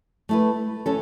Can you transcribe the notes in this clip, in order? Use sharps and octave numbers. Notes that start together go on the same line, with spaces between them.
A3 E4 B4
E3 C#4 A4